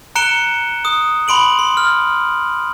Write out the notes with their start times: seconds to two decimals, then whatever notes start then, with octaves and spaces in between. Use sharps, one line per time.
0.15 A#5 F#6 C#7 D7 E7 G7
0.85 D#6
1.28 B5 C6 D7 F#7
1.59 C6
1.77 F6